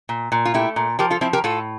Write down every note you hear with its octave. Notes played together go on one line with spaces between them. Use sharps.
A#2
A#2
F4
A3 E4 G4
A#2
F3 G4 A#4
F4 A4
F3 C4 E4
G4 A#4
A2 F4 A4